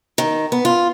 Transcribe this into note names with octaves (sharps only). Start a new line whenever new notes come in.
D#3
B3
F4